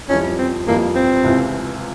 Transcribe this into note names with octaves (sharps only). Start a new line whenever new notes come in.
F2 E3 G3 C#4
C4
F2 E3 G3 A#3
C4
C#2 C3 E3